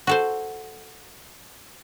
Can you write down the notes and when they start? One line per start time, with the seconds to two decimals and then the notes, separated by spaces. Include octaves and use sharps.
0.07 F#4 A4 C5